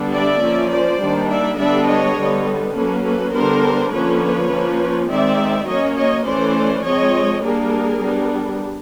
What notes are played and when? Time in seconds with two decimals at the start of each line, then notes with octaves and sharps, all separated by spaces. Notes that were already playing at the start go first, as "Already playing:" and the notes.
Already playing: D3 G3 B3 D4
0.12 D5 E5
0.42 F3 A#3 C#4
0.70 C5 D5
1.01 D#3 G3 A#3 D4
1.29 D5 E5
1.58 D3 G3 B3 D4 D5 E5
1.87 C#5 D#5
2.18 D3 G3 B3
2.75 F#3 A#3 C#4 A4 B4
3.05 A4 B4
3.33 D3 G3 B3 D4 A#4 C5
3.92 D3 F3 A#3 C#4 B4 C#5
4.51 F3 A#3 C#4
5.09 D#3 G#3 C4 D5 E5
5.67 F#3 A#3 C#4 C#5 D#5
5.96 C#5 D#5
6.25 E3 A3 C#4 C5 D5
6.84 F3 G#3 C4 C#5 D#5
7.42 G3 A#3 D4 G#4 A#4
8.01 G3 B3 D4